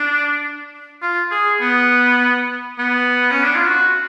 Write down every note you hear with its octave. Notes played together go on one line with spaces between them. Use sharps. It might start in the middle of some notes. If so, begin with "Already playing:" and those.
Already playing: D4
F4
G#4
B3
B3
C#4
D4
F4
F#4